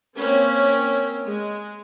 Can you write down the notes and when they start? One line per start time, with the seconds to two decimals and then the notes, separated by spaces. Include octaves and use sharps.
0.15 A#3 C4 C#4
1.25 G#3